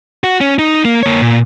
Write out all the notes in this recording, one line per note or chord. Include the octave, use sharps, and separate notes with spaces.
F#4
C#4
D#4
A#3
A#3 C#5
A#2